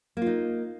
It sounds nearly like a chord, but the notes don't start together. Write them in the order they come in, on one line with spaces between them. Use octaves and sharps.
A#3 F4 D#4